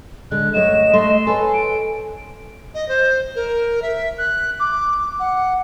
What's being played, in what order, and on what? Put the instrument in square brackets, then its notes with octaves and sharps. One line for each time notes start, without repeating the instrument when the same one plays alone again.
[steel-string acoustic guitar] D3 G#3 [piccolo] F#6
[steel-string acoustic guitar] F#2 A3 C#5 [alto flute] D#5 [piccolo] E7
[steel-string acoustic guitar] A3 E5 [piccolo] C6
[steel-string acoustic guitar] A4 B4 C#5 [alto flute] G#5
[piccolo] D7
[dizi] D#5
C5
A#4
E5
F#6
D6
F#5